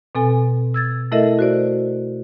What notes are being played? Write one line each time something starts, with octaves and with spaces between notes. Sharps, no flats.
B2 C4 A4 G#5
E6 G#6 A6
A3 E4 A4 A#4 D#5 E5
F#4 C5 D5